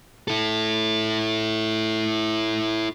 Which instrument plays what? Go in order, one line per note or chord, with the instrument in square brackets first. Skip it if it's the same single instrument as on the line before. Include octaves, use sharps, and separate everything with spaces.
[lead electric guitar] E4 A4